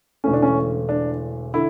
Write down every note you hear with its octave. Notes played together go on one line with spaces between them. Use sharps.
E1 E2 D3 A3 C#4
D4
C#4
D4
D3 E4